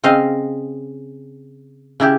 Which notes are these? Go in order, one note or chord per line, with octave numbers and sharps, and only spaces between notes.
C#3 C4 D#5 F5
C#3 E4 G4